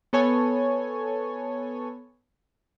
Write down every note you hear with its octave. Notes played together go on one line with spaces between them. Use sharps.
B3 A4 C#5 G#5